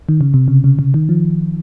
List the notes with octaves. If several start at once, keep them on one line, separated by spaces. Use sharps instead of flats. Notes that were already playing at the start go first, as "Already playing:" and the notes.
D#3
C#3
C3
C#3
C#3
C#3
D#3
F3